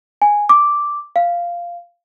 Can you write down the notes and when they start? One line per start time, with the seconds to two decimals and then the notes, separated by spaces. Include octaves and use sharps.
0.22 G#5
0.49 D6
1.16 F5